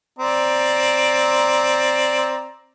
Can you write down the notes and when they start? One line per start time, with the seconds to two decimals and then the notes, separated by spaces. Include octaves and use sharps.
0.19 C4 D5 A#5